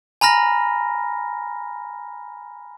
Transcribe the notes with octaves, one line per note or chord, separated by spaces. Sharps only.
G#5 A#5 B5 F6 A#6